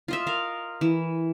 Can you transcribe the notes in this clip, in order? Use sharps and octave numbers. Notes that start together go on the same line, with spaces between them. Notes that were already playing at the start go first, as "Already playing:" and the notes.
F4 D#5 E5
A#4 F5
E3